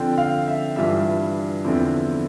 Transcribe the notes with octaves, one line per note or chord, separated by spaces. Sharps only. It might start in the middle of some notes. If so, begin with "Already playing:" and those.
Already playing: D3 F3 C4 G5
F5
E5
G2 E3 G3 D4 F4 E5
E2 D3 F3 C4 E4